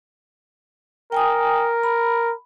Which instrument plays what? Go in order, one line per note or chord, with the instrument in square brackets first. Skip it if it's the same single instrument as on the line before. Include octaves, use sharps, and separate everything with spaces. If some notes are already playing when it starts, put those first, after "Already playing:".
[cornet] A#4 [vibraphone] G5 G#5 D#6
[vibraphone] B5